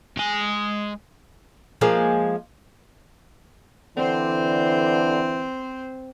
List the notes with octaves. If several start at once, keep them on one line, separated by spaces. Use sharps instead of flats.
G#3 G#5
F3 G#3 A#3
D3 E3 C4 C5